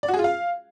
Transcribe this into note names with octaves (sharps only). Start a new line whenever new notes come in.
D5
F#4
G#4
F4
F5